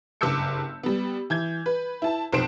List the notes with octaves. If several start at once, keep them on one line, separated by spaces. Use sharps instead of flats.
F#1 G2 D6 E6 G6 C#7
G3 B3
E3 G6 G#6
B4
E4 A5
B1 F2 C5 D7 E7